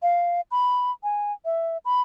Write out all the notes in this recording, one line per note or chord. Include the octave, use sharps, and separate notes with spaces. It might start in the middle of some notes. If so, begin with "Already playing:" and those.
F5
B5
G#5
E5
B5